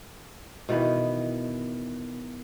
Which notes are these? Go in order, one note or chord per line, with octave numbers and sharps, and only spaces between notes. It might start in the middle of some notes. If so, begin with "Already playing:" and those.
B2 D#3 E3 B3